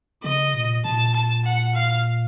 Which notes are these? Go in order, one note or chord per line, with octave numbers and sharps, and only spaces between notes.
C#3 D#5
A#2
A#2 A5
A5
F#5
F5